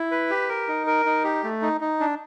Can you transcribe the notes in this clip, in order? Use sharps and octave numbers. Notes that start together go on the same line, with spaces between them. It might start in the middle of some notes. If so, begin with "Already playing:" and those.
Already playing: E4
B4
G4
A#4
D#4
A#4
D#4
G4
A3
D#4
D#4
D4